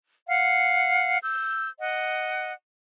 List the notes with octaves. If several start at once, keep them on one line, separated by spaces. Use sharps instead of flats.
F5 F#5
E6 G6
D#5 F#5